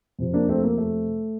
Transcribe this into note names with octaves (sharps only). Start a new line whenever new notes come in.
F2 C3 F3
A#3 D4
A3 C4
A#3
A3